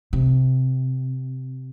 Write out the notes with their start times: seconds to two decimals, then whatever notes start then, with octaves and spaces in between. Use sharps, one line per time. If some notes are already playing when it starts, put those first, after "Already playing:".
0.13 C3